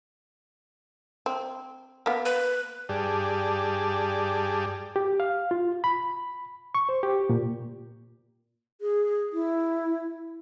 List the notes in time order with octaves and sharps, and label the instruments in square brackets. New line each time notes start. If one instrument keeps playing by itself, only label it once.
[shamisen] C4
A#3 B3
[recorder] B4
[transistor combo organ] G2 G4 G#4 D5 A5
[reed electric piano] G4
F5
F4
B5
C#6
C5
G4
A#2
[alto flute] G#4
E4